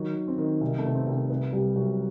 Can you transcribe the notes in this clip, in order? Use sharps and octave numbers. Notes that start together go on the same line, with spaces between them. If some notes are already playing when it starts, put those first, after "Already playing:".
Already playing: D#3 F#3
D#3
C4
D#3
C2 D#4
A3
C2 B3
C4
C2
C4
C2 B3
C2 G3
C2 F#3